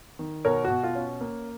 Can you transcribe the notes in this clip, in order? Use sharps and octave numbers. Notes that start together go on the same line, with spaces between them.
D#3
B2 A#4 C#5
F#4
B2
F4
C#4
A#3